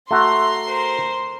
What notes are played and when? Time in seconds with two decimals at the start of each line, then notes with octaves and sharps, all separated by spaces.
0.11 A3 F#4 A#5 C6
0.65 A#4 C5